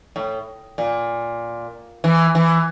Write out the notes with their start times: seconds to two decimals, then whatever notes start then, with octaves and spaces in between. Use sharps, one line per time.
0.16 A2
0.78 A#2
2.04 E3
2.35 E3